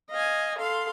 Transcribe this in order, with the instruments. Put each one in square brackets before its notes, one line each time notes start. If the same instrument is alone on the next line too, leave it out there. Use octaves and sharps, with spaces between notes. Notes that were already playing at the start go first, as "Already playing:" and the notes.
[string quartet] D#5 F5 G#5
A4 F5 C6